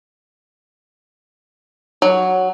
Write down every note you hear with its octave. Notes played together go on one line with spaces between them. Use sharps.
F#3